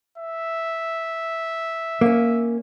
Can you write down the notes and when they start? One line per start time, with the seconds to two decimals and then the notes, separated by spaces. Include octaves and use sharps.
0.18 E5
2.01 A#3 C#4